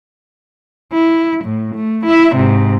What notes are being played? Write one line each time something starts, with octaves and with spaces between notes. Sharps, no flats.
E4
A2
A3
E4 E5
G#2 C3